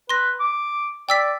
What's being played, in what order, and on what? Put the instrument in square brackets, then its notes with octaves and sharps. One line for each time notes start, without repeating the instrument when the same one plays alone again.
[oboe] B4 [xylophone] C6 A#6
[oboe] D6
[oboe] D5 [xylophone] G5 E6 B6